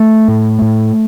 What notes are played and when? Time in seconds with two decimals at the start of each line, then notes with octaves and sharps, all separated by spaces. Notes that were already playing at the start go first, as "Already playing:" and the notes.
Already playing: A3
0.28 A2
0.62 A2